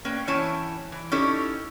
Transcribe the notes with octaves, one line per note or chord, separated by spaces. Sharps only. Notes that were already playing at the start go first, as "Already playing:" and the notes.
A#3 C#4 B4 G5
E3 C#4 E4 C#5 G5 A5
E3
C#4 D#4 E4 G4 A4 C#5